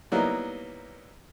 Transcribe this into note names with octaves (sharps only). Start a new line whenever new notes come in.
F#3 G3 A#3 B3 D#4 E4